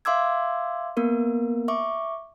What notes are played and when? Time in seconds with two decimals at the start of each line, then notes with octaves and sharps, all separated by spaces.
0.05 E5 F5 C6 D6 E6 G#6
0.97 A#3 B3 A#4
1.68 E5 C#6 D6